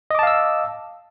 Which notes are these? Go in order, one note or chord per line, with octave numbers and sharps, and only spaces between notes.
D#5 F5 A5 D6 E6